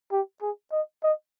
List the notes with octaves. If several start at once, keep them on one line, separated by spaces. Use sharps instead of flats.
G4
G#4
D#5
D#5